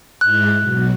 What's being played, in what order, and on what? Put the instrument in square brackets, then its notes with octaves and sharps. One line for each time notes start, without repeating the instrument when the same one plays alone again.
[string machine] G#2 G#3 E4 [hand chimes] F#6
[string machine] B2 F#3